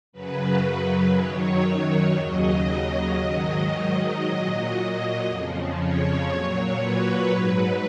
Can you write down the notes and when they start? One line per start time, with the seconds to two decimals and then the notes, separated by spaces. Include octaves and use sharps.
0.12 F#2 C#3 F#3 B4
1.14 F#2 D#3 F#3 C#5
2.17 D#2 C#3 F#3 D#5
3.20 G#2 D#3 F#3 D#5
4.22 A#2 F#3 D#5
5.25 F2 C#3 F3
5.76 C#5
6.27 A#2 F#3
6.78 B4
7.30 G#2 F#3